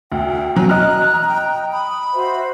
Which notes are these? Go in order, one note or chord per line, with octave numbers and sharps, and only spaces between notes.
D2 G5
B2 F#3 G5 G#5
D#5 A#5 F6 F#6
G5
B5 D#6
F#4 C5 E5